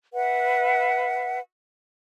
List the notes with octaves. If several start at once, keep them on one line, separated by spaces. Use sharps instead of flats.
B4 E5 F#5